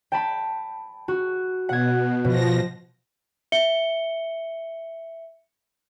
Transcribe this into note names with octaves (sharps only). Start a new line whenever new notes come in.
G5 A5 B5
F#4
B2 F#5 G#6
B2 F3 A#6
E5 C#7 G7